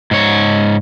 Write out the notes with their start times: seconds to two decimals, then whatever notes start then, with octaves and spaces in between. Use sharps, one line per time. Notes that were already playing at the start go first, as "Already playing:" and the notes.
0.11 G#2 C#5